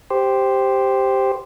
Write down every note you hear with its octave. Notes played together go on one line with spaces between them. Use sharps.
G4 C5